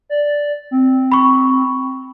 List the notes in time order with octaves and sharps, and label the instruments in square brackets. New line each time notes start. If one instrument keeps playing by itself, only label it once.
[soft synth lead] D5
C4
[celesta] B5 C#6